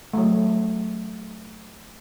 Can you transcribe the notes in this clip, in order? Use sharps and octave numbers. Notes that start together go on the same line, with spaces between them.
F#3 A3